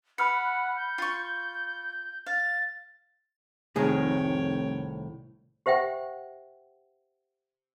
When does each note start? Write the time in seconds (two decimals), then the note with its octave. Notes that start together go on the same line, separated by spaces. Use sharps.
0.18 B4 F#5 B5 F6 C#7
0.76 G6
0.98 F4 C#6
2.26 F5 A6
3.76 F1 C2 A2 D#3 G#4 A#4 C#5 G5
5.66 G4 C5 E5 F#5 G5